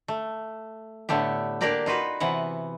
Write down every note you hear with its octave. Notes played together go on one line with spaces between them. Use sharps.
A3
A2 D3 A3 B3 G4
A#3 D4 G4 A#4 D5 G5
D#4 F4 F#4 B4
C3 E3 B3 F#5